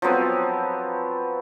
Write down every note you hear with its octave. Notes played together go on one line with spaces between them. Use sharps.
F3 F#3 B3 C4